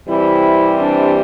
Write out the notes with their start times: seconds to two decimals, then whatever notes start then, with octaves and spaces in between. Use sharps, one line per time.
0.08 C3 E3 G3 C4 E4
0.81 D4